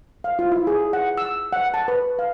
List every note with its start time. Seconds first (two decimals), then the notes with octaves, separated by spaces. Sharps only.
0.24 F5
0.39 F4
0.52 E4
0.67 G#4
0.93 F#5
1.18 E6
1.53 F#5
1.74 A5
1.88 B4
2.19 F5